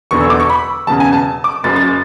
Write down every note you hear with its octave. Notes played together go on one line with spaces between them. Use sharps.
E1 E2 D3 C#6
E6
D6
C#6
B5
E1 E2 C#3 A5
G#5
A5
D6
F#1 F#2 C#3 A6
A6